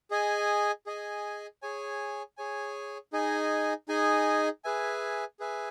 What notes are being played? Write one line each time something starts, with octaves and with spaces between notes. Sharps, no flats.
G#4 D#5 G#5
G#4 D#5 G#5
G#4 C#5 G#5
G#4 C#5 G#5
D#4 G#4 D#5 G#5
D#4 G#4 D#5 G#5
G#4 B4 E5 G#5
G#4 B4 E5 G#5